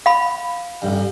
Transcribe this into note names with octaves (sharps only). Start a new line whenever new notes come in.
F5 B5
A1 G2